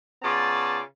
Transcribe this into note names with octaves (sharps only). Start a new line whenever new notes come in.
C#3 B3 F4 D5 A5